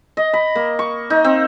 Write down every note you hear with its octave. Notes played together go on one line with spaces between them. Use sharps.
D#5
B5
A#3
C#6
D#4
C4